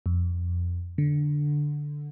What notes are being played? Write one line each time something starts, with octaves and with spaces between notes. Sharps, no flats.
F2
D3